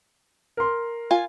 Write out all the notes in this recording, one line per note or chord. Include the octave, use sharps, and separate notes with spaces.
A#4 C6
F4 G#5